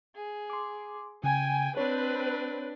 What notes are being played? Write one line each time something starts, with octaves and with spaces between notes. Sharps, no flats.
G#4
C6 D6
C#3 G5 G#5
C4 D4 B4 C#5